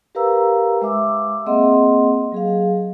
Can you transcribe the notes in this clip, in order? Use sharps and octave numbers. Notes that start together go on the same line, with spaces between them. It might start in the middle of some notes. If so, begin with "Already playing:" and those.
G4 A#4 B4 F5 A#5 E6
G#3 E5 D6 E6
A#3 C4 G#4 D#5 F#5 C6
F#3 G#4 F5